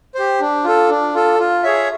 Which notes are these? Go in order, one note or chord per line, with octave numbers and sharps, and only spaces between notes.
G4 C5
D4
F4 A4
D4
F4 A4
F4
G#4 C#5 E5